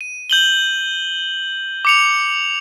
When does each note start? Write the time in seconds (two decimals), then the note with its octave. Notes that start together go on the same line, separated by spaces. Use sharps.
0.01 D#7
0.30 G6 F#7 G7
1.85 D6 C#7 F7